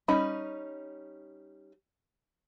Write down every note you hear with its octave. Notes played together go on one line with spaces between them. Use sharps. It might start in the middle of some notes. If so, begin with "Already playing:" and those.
G3 C#4 D#4 B5